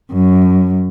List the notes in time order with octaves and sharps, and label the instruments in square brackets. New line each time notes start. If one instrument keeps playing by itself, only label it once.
[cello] F#2